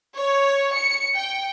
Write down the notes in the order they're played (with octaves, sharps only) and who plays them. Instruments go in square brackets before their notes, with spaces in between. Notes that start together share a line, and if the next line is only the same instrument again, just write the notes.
[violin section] C#5
C#7
G5